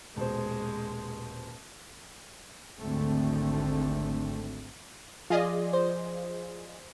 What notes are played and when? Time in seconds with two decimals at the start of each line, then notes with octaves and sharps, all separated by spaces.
0.17 D#1 B2 G#3 C5
2.78 G#1 D2 D3 A3 C4
5.30 F3 F4 G#4 D5 D#5
5.73 C5